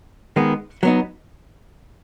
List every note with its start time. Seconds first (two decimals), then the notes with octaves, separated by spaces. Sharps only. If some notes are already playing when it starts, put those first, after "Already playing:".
0.36 D#3 G#3 B3
0.83 F#3 B3 D#4